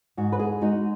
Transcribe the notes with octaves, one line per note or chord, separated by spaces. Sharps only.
G#2 F#4
B4
G#4
G#3 D#4 F#4